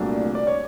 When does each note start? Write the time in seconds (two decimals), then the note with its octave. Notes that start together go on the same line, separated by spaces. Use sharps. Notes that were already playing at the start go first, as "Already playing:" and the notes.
Already playing: C2 A#2 F#3 A3 D4
0.35 D5
0.47 C#5